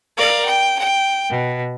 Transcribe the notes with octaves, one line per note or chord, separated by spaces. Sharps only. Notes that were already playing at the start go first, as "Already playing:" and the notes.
A#4 D5 F5
G5
G5
B2